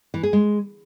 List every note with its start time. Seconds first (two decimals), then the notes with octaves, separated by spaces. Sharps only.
0.14 E3
0.23 G#4
0.33 G#3